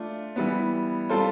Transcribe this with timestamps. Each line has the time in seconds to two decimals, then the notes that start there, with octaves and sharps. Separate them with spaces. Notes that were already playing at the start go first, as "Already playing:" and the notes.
Already playing: A3 D4 F4
0.36 E3 G3 B3
1.09 G3 C4 F4 A4 C5